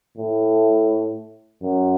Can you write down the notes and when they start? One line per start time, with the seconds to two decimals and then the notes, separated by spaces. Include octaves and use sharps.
0.17 A2
1.63 F#2